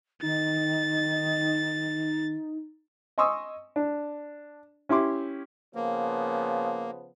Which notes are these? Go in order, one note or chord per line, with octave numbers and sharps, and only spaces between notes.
D#3 D#4 A6
D#5 G#5 C6 C#6 D#6 E6
D4
C#4 E4 G4 C6 D6
C#3 F3 A#3 B3